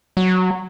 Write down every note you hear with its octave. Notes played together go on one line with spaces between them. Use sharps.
F#3